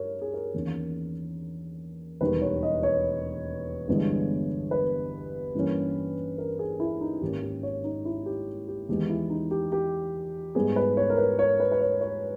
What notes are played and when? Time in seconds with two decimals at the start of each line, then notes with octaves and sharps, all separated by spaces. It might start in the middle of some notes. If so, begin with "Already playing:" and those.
Already playing: G2 A#4 C#5
0.22 G#4
0.34 A#4
0.54 E2 D#3 A#3 C#4
2.21 E1 D#2 D#3 G3 B4
2.42 C#5
2.63 D#5
2.83 C#5
3.88 G1 G2 E3 G#3 B3
4.71 B4
5.55 G2 E3 G3 A#3 C#4
6.38 A#4
6.59 G#4
6.80 E4
7.01 D#4
7.22 G#1 G#2 D#3 A#3 C#4 G4
7.42 G4
7.63 C#5
7.84 D#4
8.05 E4
8.26 G4
8.68 G4
8.89 E2 D#3 G#3 B3 G4
9.09 E4
9.30 D#4
9.51 G4
9.72 G4
10.55 G#2 G3 B3 G#4
10.76 B4
10.97 C#5
11.10 A#4
11.18 B4
11.39 C#5
11.60 B4
11.72 B4
11.80 C#5
12.01 C#5